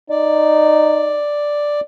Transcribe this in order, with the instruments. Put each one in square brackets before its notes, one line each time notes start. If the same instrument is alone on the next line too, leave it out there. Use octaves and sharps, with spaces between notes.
[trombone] D#4 [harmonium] D5